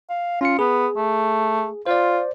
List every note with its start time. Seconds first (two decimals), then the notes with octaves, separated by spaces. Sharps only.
0.09 F5
0.41 C#4 F4 C#7
0.59 B3 G#4
0.97 A3
1.86 F4 C5 D5